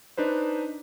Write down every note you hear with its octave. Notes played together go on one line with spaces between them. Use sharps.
D4 D#4 B4 C5